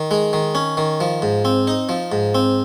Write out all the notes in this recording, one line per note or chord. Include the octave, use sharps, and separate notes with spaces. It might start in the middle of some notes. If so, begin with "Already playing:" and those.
Already playing: D#3
G#3
D#3
C#4
D#3
F3
G#2
C4
D#4
F3
G#2
C4